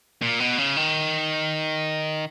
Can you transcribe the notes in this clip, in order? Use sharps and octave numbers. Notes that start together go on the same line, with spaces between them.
A#2
B2
C#3
D#3